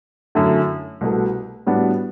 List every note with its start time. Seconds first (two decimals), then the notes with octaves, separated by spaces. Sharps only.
0.35 F#2 D3 A3 E4
1.01 C2 B2 A3
1.67 A2 G3 B3 D4 F#4